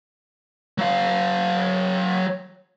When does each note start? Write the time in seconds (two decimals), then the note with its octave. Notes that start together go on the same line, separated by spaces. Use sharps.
0.78 F#3 F5